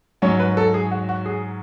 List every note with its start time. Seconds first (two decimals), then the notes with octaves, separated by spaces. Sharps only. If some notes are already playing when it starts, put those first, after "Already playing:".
0.22 G#2 F#3 C#4 C#5
0.40 B4
0.57 A4
0.74 G#4
0.91 F#4
1.09 F#4
1.26 G#4